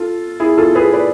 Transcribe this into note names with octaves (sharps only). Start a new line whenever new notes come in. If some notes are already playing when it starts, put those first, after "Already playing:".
Already playing: F4 A4
E4 G#4
F4 A4
G#4 B4
B4 D5